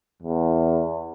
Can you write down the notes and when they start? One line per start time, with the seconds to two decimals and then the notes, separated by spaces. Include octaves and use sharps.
0.22 E2